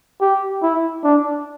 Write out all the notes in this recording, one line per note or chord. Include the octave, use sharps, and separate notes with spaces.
G4
E4
D4